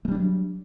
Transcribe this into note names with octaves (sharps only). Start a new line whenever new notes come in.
F#3 G3 A3 D4